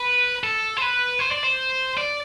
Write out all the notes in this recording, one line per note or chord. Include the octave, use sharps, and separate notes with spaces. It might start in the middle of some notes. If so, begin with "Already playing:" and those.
Already playing: B4
A4
C5
B4
C5
D5
C5
D5